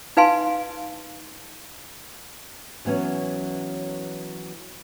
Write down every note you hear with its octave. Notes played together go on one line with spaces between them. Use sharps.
D#4 B4 F5 G#5 C6
E3 F#3 B3 C#4